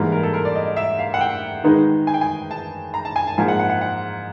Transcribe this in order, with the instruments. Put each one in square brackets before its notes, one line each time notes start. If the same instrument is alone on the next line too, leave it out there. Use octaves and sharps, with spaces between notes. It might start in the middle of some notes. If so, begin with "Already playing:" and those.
Already playing: [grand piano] G#2 E3 G3 A#3
A#4
A4
A#4
D5
D#5
E5
F5
F#5
G5
D#3 G#3 B3 D#4
G#5
G5
G#5
A5
A#5
A5
G#5
A5
G#2 F3 A#3 G#5
F#5
F#5
F#5
F#5